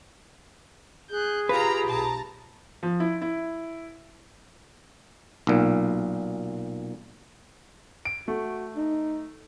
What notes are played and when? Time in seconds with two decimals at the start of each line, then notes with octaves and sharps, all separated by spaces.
1.10 G#4 F#6 G6
1.49 F4 G4 B4 F5 A#5 B5
1.87 B1 A5 A#5
2.83 F3
3.00 E4
3.22 E4
5.47 B1 A#2
8.05 D7
8.28 A3 F#4
8.77 D#4